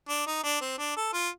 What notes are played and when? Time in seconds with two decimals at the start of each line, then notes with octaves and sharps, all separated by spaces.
0.09 D4
0.27 D#4
0.44 D4
0.61 C4
0.79 D4
0.97 A4
1.13 F4